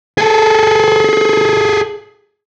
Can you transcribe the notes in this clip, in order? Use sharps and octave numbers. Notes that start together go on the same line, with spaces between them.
G#4 A4